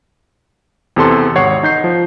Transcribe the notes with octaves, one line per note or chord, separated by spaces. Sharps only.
E2 C3 A4 C6
G#1 C#5 F#5 C7
D#4 G6 C7
F3